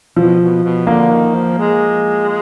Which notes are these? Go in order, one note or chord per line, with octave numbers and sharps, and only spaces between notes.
B2 F3
B2
B2
D3 A#3
D#3
F3
G#3